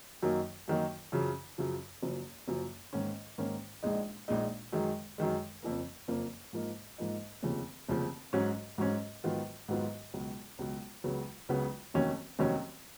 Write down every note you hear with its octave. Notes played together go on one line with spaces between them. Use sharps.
F#2 D#3 F#3 A#3 D#4
F#2 D#3 F#3 A#3 D#4
F#2 C#3 F3
F#2 C#3 F3
F#1 F#2 F3
F#1 F#2 F3
G#2 D#3 A#3 C#4
G#2 D#3 A#3 C#4
A#1 A#2 G#3 D#4
A#1 A#2 G#3 D#4
F#2 D#3 G#3
F#2 D#3 G#3
F#1 F2 F3 A#3
F#1 F2 F3 A#3
G#2 F3 A#3 D#4
G#2 F3 A#3 D#4
F1 D#2 C#3 F3
F1 D#2 C#3 F3
G#2 F#3 C#4
G#2 F#3 C#4
G#2 D#3 F#3 B3 F4
G#2 D#3 F#3 B3 F4
C#2 B2 F#3
C#2 B2 F#3
C#2 C#3 F#3 B3
C#2 C#3 F#3 B3
F1 D#2 D#3 F#3 C#4
F1 D#2 D#3 F#3 C#4